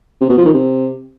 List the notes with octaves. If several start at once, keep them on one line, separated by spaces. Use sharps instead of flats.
C3
B2
F3
D#3
C3